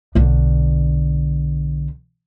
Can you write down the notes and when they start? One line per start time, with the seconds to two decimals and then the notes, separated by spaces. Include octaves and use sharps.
0.15 B1 D3